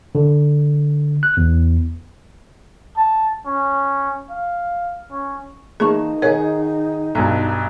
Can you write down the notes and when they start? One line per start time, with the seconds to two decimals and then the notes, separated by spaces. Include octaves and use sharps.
0.15 D3
1.23 F#6
1.37 E2
2.97 A5
3.46 C#4
4.31 F5
5.12 C#4
5.80 E3 A#3 D#4 G#4 A5 C#6
6.22 D#3 G#4 A#4 C#5 F#5
7.15 B1 G2 A#5